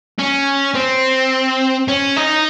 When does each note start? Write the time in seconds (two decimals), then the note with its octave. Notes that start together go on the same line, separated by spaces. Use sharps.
0.19 C#4
0.75 C4
1.88 C#4
2.17 D#4